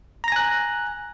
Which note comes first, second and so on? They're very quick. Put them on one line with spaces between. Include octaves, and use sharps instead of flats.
A#5 A#6 G#5 F#6